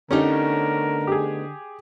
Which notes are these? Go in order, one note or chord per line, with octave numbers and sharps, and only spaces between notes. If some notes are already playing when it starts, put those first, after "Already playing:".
D3 A3 B3 C#4 D#4 G4 A#4
G4 G#4